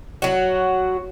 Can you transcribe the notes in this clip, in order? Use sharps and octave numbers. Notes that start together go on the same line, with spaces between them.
F#3 F#4